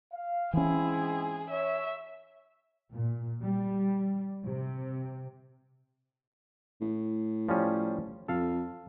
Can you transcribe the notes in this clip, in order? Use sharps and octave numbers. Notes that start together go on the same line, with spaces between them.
F5
G#2 E3 C4 C#4 E4 G#4
C#5 E5
A#2
G3
C3
A2
F3 G3 C#4
F2 A4 F5